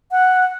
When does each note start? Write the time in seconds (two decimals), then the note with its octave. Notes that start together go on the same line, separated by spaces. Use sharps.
0.11 F#5